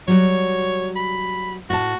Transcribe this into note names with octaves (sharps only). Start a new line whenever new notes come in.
F#3 G3 F#4 C#5
B5
A2 F#4 A5